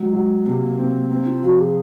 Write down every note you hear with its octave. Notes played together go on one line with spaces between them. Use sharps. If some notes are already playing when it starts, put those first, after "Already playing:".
Already playing: F#3 G#3
F#3
C3 A#3 C4
C4
A#3 C4
F4
F3 F#4
G#4